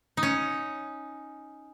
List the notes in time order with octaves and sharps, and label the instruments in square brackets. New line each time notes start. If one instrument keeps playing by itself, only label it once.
[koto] D#4
C#4